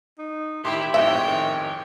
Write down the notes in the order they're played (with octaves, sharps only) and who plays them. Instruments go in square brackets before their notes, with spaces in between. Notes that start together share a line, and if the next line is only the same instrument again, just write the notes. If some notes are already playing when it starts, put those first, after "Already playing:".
[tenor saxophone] D#4
[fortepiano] A1 C6 D6 [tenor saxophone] D#3 [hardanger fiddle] E4 G4
[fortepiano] A1 F2 G#2 [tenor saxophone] G#4 [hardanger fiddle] C#5 G5 [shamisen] E5
[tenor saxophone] D#3